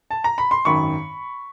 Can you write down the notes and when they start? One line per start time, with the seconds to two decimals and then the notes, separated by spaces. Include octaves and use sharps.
0.11 A5
0.24 A#5
0.38 B5
0.51 C6
0.65 G#1 F#2 D#3 B5 C#6